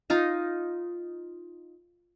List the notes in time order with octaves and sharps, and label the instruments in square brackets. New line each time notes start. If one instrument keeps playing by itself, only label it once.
[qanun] D#4 F4 A#5